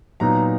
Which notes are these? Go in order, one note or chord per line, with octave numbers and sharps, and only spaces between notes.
A#2 F#3 B3 D#4 A#5